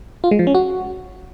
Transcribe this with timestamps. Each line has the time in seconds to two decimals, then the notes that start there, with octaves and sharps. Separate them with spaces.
0.24 F4
0.31 G#3
0.39 F3
0.47 C#4
0.55 F#4